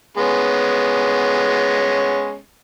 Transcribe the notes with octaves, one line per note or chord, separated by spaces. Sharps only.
G#3 B3 C#4